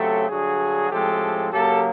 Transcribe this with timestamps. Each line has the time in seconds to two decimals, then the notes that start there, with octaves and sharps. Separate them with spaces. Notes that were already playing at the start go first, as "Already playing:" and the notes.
Already playing: C#3 F#3 A3 C4 G4 A4
0.29 G2 D3 F#3 F#4 G#4
0.90 A2 F3 G#3 C4 G4 A4
1.52 C#3 F#3 A#3 G4 A4